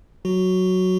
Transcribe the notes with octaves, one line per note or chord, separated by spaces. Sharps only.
F#3 F#4